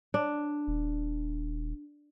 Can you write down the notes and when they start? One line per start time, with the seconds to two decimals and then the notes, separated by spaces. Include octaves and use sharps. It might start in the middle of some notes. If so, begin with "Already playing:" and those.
0.14 D4
0.67 D#1